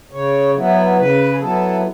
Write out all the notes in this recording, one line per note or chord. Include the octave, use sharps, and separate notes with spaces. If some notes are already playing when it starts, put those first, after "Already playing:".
C#3 C#5
F#3 B3 E4
C#3 B4
G#4
F#3 B3 E4 A4